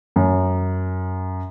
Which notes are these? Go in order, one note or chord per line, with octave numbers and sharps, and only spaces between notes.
F#2